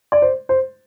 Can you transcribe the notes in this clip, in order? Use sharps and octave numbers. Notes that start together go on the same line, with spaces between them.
D5
C5
C5